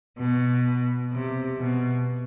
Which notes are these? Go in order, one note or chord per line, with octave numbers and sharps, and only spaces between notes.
B2
C3
B2